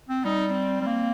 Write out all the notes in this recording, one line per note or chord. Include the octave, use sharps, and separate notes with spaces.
C4
G3 D#4
C4
G3
A#3